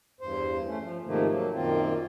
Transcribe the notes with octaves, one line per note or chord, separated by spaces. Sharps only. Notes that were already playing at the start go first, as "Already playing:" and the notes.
E2 G2 C5
A3 C#4
F3
G#2 C3 D#3 F3 A3 A#3
F#3 A#3
F#2 A#2 D#3 A#3 C4 F4